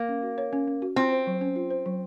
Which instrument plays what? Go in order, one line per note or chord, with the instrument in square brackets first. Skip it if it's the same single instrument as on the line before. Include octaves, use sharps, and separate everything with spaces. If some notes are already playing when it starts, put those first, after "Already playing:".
Already playing: [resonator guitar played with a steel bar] A#3
[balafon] C#4
F#4
C#5
C#4
C#4
F#4
[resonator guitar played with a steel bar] C4 [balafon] F4
[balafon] C5
F#3
C#4
F4
C5
F#3